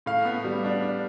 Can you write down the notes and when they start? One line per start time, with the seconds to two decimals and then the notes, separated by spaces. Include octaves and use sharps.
0.06 A2 F5
0.25 B3
0.45 G3
0.64 D4
0.83 D4